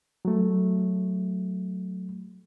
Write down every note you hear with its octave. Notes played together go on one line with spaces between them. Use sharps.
F#3 A3